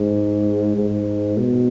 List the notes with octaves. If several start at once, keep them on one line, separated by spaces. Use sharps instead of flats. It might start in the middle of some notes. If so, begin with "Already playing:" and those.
Already playing: G#2
G#2
B2